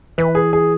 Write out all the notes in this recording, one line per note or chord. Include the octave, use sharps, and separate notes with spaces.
E3 B4
G#4
G#4